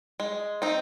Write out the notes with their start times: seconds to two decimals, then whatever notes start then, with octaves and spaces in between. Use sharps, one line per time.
0.20 G#3
0.62 C4 D#4